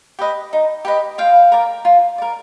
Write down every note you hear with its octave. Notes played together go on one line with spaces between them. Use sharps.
G4 B4 D#5
D#4
G4 B4 D#5
F4 F5 G5
A#4 D5
F4
A#4 D5